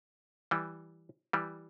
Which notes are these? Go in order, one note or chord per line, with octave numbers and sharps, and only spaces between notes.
E3 G3
E3 G3